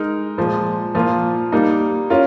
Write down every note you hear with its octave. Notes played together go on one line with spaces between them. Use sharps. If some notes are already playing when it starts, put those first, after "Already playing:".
Already playing: G#3 D#4 A#4
A#2 F3 G#3
A#2 F3 A#3 F4
G3 A#3 D#4
C#4 F4 A#4